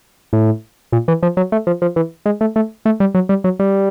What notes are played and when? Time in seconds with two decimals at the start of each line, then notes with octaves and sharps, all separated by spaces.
0.33 A2
0.92 A#2
1.08 E3
1.23 F3
1.37 F#3
1.52 A3
1.67 F3
1.82 F3
1.96 E3
2.26 G#3
2.41 A3
2.56 A3
2.86 A3
3.00 G3
3.15 F#3
3.29 G3
3.44 F#3
3.59 G3